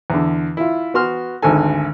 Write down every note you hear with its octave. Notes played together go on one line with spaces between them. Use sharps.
E2 D3
E4 F4
B3 F#4 C6 F6
G#1 D2 A4 G#5